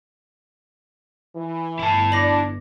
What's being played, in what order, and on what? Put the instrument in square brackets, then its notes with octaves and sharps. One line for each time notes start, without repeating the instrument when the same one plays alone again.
[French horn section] E3
[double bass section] G1 [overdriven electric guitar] E4 A5
[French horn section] D4 [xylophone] D6 A#6 F#7